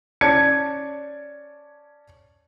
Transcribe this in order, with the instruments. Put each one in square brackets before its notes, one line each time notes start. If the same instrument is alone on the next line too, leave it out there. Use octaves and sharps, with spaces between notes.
[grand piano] C#4 D5 A5 G#6 C#7